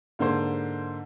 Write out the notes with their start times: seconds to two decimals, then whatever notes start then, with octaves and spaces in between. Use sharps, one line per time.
0.19 G#2 D3 A#3 C5